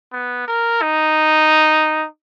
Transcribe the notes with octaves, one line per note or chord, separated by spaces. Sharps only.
B3
A#4
D#4